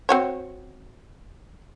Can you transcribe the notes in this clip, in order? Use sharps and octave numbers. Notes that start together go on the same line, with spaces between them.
C4 F#4 C#5